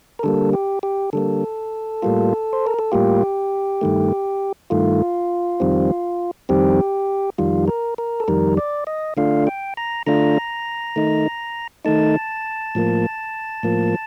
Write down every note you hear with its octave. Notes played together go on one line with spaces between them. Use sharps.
A#4
D3 G3 A#3 A4
G4
G4
D3 G3 A#3 A4
A2 G3 A#3 F4
C5
A#4
A4
A2 G3 A#3 F4 G4
G2 D#3 A3
G2 D#3 A3 F4
F2 D#3 G3 C4
F2 D#3 G3 C4 G4
F2 D#3 G3 F4
A#4
A#4
A4
F2 D#3 G3 A#4
D5
D#5
D3 A3 D4 F4 F5
G5
A#5
D3 A3 D4 F4 A#5
D#3 A3 D#4
D#3 A3 D#4 A5
A2 F3 A#3
A2 F3 A#3